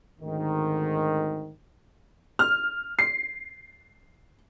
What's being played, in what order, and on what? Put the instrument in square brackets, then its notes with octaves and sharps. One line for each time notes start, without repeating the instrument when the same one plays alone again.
[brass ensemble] G#1 D2 G#2 D#3
[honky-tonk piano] F6
C7